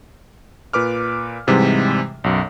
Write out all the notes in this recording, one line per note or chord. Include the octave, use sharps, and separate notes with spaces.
A#2 B4 D6 F6
G#2 C3 E3 G3 G#3
B1 F#2